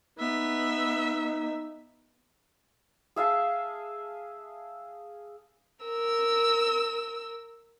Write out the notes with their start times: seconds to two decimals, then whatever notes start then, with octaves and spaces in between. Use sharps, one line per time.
0.19 B3 D#4 E5
3.16 G#4 E5 F5 A5
5.84 A#4 E6